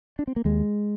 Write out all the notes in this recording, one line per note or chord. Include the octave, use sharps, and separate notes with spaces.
D4
C4
A#3
D#2 G#3